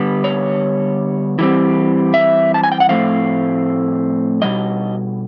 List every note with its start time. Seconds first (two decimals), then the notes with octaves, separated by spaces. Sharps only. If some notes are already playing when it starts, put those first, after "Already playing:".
Already playing: D3 G3 B3
0.24 C#5
1.39 E3 G3 C4
2.14 E5
2.54 A5
2.64 G#5
2.72 G5
2.80 F#5
2.89 A2 F3 A3 C4 F5
4.42 B2 G3 D#5